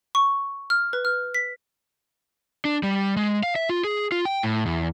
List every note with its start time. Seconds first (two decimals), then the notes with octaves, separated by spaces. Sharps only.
0.15 C#6
0.70 F6
0.93 B4
1.05 F6
1.34 B6
2.65 D4
2.83 G3
3.17 G#3
3.43 F5
3.56 E5
3.69 F4
3.84 G#4
4.12 F4
4.25 G5
4.43 A2
4.66 E2